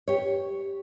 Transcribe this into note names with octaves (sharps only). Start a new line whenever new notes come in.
G4 C#5